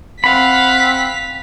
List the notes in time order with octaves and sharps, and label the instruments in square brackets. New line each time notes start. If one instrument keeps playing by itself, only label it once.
[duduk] C4 [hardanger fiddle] F5 F#5 [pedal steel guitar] B5 [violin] B6